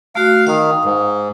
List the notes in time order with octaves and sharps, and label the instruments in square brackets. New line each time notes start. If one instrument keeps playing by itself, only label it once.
[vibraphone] A3 F#4 [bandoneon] F5
[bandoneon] D#3 [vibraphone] F5 D#6
[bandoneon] G#2